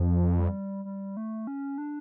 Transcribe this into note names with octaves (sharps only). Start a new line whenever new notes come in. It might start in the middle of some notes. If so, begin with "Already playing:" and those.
Already playing: F2 F3
G3
G3
A3
C#4
D4